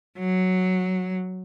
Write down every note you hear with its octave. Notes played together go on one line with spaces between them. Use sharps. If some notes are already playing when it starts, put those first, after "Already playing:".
F#3